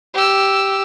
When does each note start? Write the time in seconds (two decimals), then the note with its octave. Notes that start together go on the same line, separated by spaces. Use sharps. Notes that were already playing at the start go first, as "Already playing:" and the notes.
0.14 G4 E6